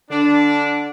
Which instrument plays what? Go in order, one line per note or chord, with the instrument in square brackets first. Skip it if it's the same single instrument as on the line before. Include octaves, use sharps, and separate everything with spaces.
[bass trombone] D3 [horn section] D4